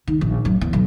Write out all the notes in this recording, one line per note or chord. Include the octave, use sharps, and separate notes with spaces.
D#3
A#1
F#2
E2
B1